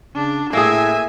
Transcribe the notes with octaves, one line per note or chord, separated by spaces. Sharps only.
C#3 D4
A2 A#3 G#4 E5 G#5